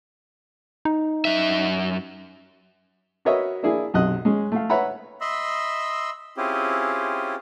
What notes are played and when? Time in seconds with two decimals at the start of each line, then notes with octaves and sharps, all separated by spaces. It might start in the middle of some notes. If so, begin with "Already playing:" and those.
0.85 D#4
1.25 F#2 E5
3.25 F#4 A#4 B4 C#5 D#5 E5
3.63 A#3 D4 E4 G#4
3.94 B1 F#2 C3 D#5 F#6
4.25 G#3 C#4
4.52 A3 F5
4.70 B4 C#5 E5 F#5 A#5 B5
5.21 D#5 E5 B5 C6 E6
6.37 C4 C#4 E4 F4 G4 G#4